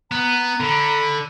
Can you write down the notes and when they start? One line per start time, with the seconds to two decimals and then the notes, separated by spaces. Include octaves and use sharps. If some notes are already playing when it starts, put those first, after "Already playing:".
0.11 B3 A#5
0.60 D3 B5